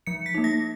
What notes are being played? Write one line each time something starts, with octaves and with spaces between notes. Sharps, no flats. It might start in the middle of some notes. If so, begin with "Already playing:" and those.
F3 C#7
B6
A#3 D#4
A#6